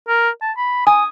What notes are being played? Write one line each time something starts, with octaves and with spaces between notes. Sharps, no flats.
A#4
A5
B5
G#5 D#6